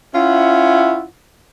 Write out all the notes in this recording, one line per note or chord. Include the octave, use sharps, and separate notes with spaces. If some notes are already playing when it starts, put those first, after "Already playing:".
C#4 E4 F4 E5 F#5